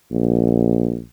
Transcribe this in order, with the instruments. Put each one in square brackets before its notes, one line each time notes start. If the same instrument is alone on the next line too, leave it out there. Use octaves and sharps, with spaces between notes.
[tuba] A#1